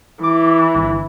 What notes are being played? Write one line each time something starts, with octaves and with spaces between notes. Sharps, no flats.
E3 D6
G1